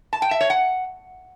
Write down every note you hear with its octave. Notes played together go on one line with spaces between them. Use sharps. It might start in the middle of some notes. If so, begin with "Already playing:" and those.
A5
G5
E5
C#5
F#5